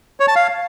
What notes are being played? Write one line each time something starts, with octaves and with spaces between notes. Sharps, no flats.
C#5
A5
F5